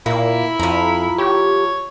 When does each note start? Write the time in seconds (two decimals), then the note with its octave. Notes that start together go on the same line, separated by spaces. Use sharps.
0.06 A#2 A#3 E4 B5
0.60 F2 F3 A#5 B5
1.18 G4 C#5